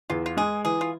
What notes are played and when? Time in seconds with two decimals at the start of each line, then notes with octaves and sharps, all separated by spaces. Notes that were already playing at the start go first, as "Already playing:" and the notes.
0.10 E2 F4
0.26 F4
0.37 G#3 G#4
0.65 E3 G#4
0.81 F4